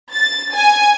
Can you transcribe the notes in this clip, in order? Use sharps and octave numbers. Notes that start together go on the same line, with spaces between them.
A6
G#5